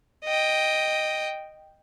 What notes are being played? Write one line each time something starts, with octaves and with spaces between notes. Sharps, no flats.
D#5 G5